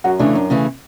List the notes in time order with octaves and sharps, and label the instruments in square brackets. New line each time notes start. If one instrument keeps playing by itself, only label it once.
[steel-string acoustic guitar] F#2 [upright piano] F#4
[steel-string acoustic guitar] C#3 E3 A3 [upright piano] D4
[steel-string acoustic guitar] F#2
C#3 E3 A3